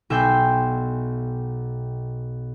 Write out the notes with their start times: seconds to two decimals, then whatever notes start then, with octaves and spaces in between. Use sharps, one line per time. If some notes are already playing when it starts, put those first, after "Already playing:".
0.10 B1 E5 G5 G#5 C6 G6